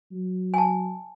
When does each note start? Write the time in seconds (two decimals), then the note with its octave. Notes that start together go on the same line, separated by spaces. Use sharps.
0.12 F#3
0.54 G#5 A5